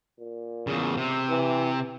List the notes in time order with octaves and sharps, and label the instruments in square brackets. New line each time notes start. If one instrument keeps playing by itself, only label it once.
[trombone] A#2
[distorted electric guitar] E2 C#3
C3
[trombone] E3